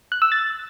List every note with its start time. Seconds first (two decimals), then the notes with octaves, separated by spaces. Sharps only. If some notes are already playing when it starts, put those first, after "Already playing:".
0.12 F#6
0.22 E6
0.32 A6